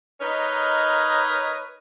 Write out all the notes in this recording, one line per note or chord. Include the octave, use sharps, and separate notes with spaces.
D#4 A#4 B4 C#5 D#5